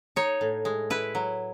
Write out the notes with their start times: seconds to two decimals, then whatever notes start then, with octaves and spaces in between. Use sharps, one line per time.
0.16 D#4 C#5
0.41 A2
0.65 G#3
0.90 E4 B4
1.15 F#3